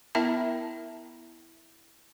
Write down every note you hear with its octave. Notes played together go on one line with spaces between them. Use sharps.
B3 E4 A#4 E5 A5 A#5